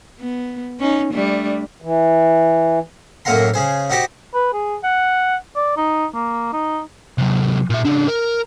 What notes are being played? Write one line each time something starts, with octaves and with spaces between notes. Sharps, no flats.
B3
C#4 D#4
G3 A3 D4
E3
F#2 A2 A#3 F#5 A#5 C6
C#3 G#4 C5
D#4 F#4 G4 C5 D#5 G5
B4
G#4
F#5
D5
D#4
A#3
D#4
C3 F#3
A#2 E5
C#3 D4
A#4